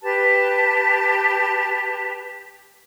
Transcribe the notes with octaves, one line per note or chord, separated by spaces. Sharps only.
G4 B4 A5